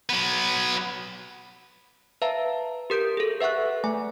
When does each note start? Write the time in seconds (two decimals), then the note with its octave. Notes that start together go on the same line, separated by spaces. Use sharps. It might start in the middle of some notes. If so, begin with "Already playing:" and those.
0.09 F#3 B3
2.22 B4 E5 F5 A5 A#5
2.90 G4 A#4 G6 D7
3.17 G#4 A4
3.41 B4 E5 F#5 C#6 F#6
3.84 A3 G#5